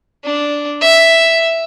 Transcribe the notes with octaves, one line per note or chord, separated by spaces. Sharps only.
D4
E5